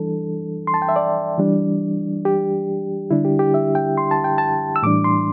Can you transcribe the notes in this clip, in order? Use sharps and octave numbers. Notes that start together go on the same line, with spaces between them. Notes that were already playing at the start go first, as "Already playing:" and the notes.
Already playing: E3 G3 D4 A4
C6
A5
G5
E5
D5
E3 G3 D4
G4
D3 G3 D4 E4
G4
G4
E5
G5
C6
A5
G5
A5
E6
A2 E3 G3 D4 D6
C6